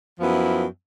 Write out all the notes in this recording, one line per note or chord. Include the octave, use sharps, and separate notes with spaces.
F#2 F3 B3 E4